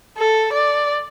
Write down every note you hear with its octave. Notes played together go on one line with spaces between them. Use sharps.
A4
D5